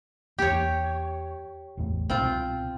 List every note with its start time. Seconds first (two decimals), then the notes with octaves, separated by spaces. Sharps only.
0.39 E2 A#3 G4 C#5
1.77 A1 E2 A3
2.10 C2 B2 C4 F4